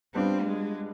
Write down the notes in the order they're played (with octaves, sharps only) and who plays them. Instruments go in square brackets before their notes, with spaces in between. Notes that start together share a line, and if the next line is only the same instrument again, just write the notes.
[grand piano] G3 B3 D4 F4 [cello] C4
[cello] G#3